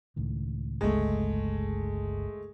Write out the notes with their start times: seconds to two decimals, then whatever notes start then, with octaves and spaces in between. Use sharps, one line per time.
0.16 C#2 A2 D#3
0.81 G1 C#2 G#3 A3